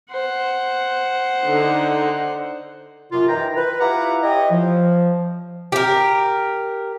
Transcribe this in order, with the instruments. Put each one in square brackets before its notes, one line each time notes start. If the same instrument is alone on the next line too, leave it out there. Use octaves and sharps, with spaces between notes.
[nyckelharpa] C5 F#5
[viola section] D3 D#4
[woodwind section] F#2 C3 F4
D#3 E3 G5 A#5
B4
E4 F4 G4 B4 F#5 A#5
E4 G4 C#5 D#5
F3
[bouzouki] G4 A#4